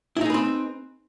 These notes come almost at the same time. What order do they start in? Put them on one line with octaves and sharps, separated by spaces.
E4 D#4 G#4 B4 C4